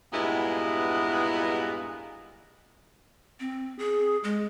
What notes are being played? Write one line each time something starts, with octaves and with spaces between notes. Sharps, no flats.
G2 A#2 G#3 B3 E4 F#4
C4
G#4
G#3